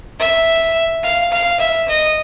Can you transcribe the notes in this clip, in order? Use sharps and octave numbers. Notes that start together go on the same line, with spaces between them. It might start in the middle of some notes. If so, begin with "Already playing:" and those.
E5
F5
F5
E5
D#5